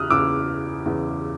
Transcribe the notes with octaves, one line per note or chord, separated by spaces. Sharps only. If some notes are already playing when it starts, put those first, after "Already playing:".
Already playing: E2 C#3 E3 D#6 F6 F#6
E2 C#3 E3 D6 E6
E2 C#3 E3